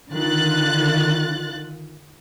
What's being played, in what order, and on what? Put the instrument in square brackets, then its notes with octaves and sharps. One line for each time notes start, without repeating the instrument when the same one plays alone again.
[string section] D3 D#3 F4 F#6 A6